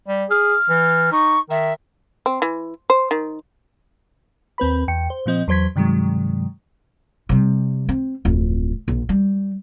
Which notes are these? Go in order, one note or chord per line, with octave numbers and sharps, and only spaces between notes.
G3
G#4 F6
E3
D#4 C#6
D#3 E5
C4
E3
C5
D#3
D#2 C4 B4 B5
E2 G5 C#7
C5
A#2 F3 C4 D#5
E2 F#3 C5 G#6 B6
G2 C3 D#3 F#3 G#3
C3 G3
C4
D1 F2
A#1
G3